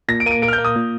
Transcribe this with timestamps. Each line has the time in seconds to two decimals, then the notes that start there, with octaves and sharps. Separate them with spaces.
0.08 A#2 A#6
0.20 D7
0.26 A#3 D#7
0.31 D7
0.42 A#3 D7
0.48 F6
0.53 G6
0.58 A#3
0.65 D#6
0.76 A#2